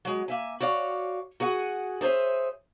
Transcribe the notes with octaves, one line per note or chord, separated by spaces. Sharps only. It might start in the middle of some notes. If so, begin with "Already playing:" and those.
F#3 G#3
A#3 E5 G#5
F#4 C#5 D5 F5
F#4 G#4 F#5 G#5
G#4 A4 C5 C#5 E5